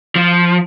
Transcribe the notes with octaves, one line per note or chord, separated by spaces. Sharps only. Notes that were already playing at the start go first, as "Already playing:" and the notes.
F3